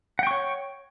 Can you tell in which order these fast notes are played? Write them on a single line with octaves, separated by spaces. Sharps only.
F#5 G5 C#6 C#5